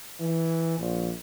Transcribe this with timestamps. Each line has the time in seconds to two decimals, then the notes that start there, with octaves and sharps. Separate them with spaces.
0.20 E3
0.79 A#1